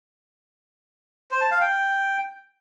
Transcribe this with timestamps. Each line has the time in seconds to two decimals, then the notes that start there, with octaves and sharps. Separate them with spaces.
1.31 C5
1.41 A5
1.51 F5
1.61 G5